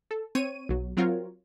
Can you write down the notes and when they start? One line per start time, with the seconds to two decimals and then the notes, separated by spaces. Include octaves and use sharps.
0.11 A4
0.35 C4 C#5 D#7
0.69 B1 F#3
0.97 F#3 C4 F4 F#4 A#4 C#5